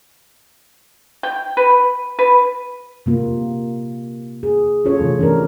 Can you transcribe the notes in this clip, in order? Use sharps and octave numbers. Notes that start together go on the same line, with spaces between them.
G5
B4
B4
C3 A#3 F4
G#4
C#4 F4 A4 C#5
C3 E3 F3 A3
C#4 D4 A#4